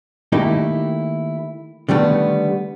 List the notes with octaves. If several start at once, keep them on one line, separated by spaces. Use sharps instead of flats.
D#3 A3 A#3 D#4 E4 G4
D3 D#3 G3 A3 B3